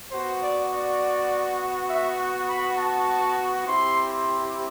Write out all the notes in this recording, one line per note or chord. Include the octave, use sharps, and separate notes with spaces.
B3 F#4 C5
D5
D5
E5
F#5
B5
A5
C4 E4 G4 C6
C6